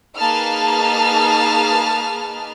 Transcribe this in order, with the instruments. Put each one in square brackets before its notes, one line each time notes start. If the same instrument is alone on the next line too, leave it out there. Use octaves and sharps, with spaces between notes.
[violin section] A#3 D#4 G#4 B4 A5 F6